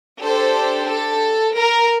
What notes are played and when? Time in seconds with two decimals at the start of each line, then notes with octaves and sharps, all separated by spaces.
0.22 D4 G4 A4 C5
0.88 A4
1.54 A#4